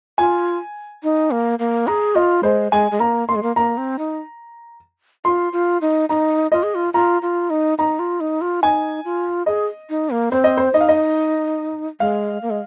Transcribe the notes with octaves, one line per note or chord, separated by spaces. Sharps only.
F4 G#5
D#4
A#3
A#3
G#4 A#5
F4 D#5
G#3 C5
G#3 G#5
G#3
A#3 A#5
A#3 C6
G#3
A#3
A#3 A#5
C4
D#4
F4 C6
F4
D#4
D#4 A#5
F4 D#5
G#4
F4
F4 A#5
F4
D#4
D#4 A#5
F4
D#4
F4
D#4 G#5
F4
G#4 D#5
D#4
A#3
C4 C5
D#5
C5
D#4 D#5
F5
D#5
G#3 F5
A#3
G#3